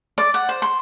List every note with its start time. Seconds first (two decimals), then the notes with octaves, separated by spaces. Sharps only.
0.18 D5
0.34 F#5
0.49 C5
0.62 C6